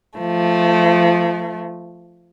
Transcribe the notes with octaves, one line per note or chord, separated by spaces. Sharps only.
F3 A3